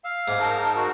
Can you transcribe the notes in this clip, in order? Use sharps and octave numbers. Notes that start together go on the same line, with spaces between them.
F5 E6
G#2 D6
D#4 A#4 A5
F#4